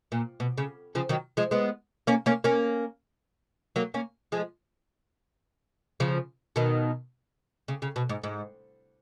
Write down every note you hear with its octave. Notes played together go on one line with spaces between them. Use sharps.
A#2
B2
C#3
C#3 F3
D#3 F#3
F3 G#3
G#3 B3
A#3 C#4
A#3 C#4
A#3 C#4
F#3 A#3
A#3 C#4
F3 G#3
C#3 F3
B2 D#3
C#3
C#3
B2
G#2
G#2